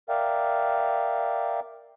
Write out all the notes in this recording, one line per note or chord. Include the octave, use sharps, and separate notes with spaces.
A#4 D5 E5 F5 G5